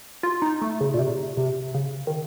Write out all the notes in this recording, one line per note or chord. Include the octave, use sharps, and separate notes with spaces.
F4
D#4
A3
C#3
A#2
C3
C3
C#3
D#3